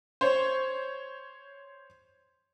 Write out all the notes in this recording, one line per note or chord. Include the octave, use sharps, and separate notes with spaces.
C5 C#5